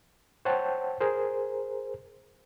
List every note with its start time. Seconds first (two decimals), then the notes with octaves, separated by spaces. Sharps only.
0.45 C5 C#5 F#5 G5 A5
1.00 G#4 A#4 C5